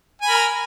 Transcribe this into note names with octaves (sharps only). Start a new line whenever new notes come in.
A#4 G#5 B5